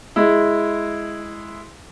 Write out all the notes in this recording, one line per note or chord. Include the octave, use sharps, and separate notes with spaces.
G#3 E4